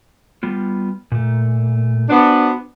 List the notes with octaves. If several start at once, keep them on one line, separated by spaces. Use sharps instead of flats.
G3 B3 F4
A#2 A3
B3 D4 F#4 C5